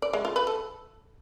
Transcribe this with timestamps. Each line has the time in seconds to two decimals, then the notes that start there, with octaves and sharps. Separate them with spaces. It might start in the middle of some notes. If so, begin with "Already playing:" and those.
0.02 D5
0.13 G#3
0.25 F4
0.36 B4
0.47 A4